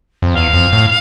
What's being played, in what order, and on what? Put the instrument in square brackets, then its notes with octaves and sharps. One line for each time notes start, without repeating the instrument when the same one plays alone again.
[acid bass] F2
[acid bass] E2 [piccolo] F5
[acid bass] F2
A2